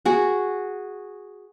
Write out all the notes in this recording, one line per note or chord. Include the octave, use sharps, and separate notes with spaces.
F#4 G#4